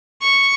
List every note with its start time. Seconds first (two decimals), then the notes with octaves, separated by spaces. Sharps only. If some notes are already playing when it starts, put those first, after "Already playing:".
0.22 C#6